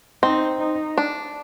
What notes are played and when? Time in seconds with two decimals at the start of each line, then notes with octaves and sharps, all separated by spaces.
0.23 C4 D#4
0.60 D#4
0.98 D4